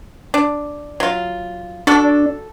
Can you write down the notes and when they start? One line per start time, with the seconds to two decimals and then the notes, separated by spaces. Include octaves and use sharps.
0.34 D4
1.00 F#3 F4
1.87 D4 F#4 A4